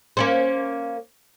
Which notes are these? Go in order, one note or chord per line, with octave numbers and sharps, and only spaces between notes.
A#3 C#4 C5